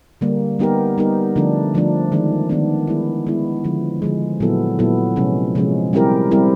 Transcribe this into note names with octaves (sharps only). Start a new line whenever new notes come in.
D3 G3 A#3
G3 B3 D#4 G4 A#4
G3 B3 D#4 G4 A#4
D3 F3 A3 D4
D3 F3 A3 D4
D#3 G#3 B3 D4
D#3 G#3 B3 D4
G#3 B3 E4
G#3 B3 E4
D3 F3 G#3
D3 F3 G#3
A#2 F#3 B3 E4 A4
A#2 F#3 B3 E4 A4
C3 F3 G#3 C#4
C3 F3 G#3 C#4
G3 C4 E4 G4 A#4
G3 C4 E4 G4 A#4